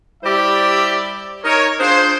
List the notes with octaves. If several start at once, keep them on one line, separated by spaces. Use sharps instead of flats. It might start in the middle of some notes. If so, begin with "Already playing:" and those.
G3 E4 G4 C5 D5 E5
D#4 A#4 C#5
D4 F4 G#4 C5